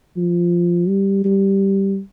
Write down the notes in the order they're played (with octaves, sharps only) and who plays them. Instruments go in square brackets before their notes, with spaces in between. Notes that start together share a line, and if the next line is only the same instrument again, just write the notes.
[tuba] F3
G3
G3